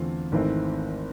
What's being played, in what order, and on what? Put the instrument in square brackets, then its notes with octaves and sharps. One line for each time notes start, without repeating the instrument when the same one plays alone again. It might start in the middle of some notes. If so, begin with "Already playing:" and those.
Already playing: [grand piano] E2 D3 A3 C4 F4
G#1 G#2 E3 A3 C4